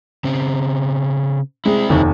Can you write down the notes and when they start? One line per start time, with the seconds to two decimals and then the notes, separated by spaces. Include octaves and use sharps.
0.24 C#3 C4
1.65 G#3 C4 E4
1.89 F1 D#2